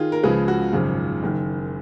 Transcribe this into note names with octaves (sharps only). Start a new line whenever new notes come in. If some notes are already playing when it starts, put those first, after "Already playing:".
Already playing: D#3 F4 G#4
A#4
C#2 C#3 F3 G#4 B4
F#4
G#1 F#2 C#3 F3
F#1 F#2 D#3